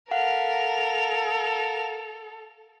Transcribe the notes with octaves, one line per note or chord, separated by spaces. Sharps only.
A4 A#4 F5 F#5 F7